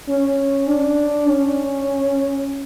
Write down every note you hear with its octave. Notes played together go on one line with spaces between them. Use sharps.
C#4
D4
C#4